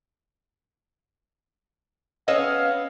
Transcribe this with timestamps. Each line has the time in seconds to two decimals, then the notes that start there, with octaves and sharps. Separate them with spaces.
2.28 B3 C#4 D#5 F5 E6